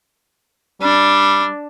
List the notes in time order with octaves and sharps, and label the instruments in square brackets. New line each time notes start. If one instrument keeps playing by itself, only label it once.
[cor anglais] G3 [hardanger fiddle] D4